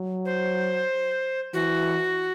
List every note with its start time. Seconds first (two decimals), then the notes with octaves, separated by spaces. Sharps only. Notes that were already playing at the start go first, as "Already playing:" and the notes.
Already playing: F#3
0.25 C5
1.54 E3 F#4